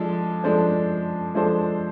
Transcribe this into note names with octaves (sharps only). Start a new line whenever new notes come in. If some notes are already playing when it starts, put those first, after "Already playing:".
Already playing: F3 G#3 D4 A4
F3 G#3 D4 A4 C5
F3 G#3 D4 A4 C5